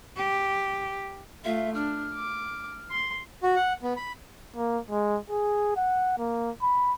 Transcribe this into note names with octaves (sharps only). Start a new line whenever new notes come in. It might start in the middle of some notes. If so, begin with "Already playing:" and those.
G4
A3 F4 E5
D4 F6
D6
C6
F#4
F#5
B3
B5
A#3
G#3
G#4
F#5
A#3
B5